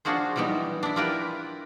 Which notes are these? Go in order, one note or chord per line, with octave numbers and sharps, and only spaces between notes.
D4 F4 F#4 G#4 C5
E3 F#3 G3 B3 D#4
D4 E4
E4 F4 G4 A#4 B4 D5